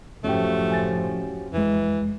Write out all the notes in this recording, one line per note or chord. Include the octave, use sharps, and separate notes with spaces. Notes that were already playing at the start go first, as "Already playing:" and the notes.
F#1 A2 F3 A3 C#4 F#4 G4
G#5 A6
F2 E3 G#3